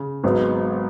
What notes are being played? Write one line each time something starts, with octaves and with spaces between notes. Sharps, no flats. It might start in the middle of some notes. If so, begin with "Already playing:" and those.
Already playing: C#3
G#1 G#2 F#3 B3